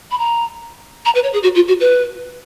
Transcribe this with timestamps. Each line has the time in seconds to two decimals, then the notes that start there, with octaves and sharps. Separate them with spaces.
0.11 B5
0.19 A#5
1.05 A#5
1.15 B4
1.23 C#5
1.33 G#4
1.43 F#4
1.55 F4
1.68 F#4
1.80 B4